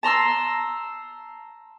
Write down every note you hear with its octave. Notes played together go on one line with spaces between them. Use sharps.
A5 A#5 C6 E6